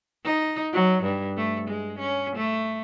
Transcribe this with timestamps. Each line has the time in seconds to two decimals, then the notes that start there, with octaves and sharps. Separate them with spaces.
0.24 D#4
0.73 F#3
1.04 G2
1.37 A3
1.68 G#3
1.99 C#4
2.36 A3